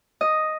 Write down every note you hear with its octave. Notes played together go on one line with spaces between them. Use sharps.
D#5